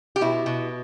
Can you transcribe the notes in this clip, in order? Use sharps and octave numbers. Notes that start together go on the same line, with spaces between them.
G4
B2 E4
B2